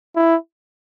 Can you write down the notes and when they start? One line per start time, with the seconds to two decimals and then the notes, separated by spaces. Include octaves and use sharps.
0.16 E4